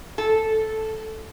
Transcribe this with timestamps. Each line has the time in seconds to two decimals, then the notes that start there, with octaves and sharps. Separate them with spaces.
0.18 A4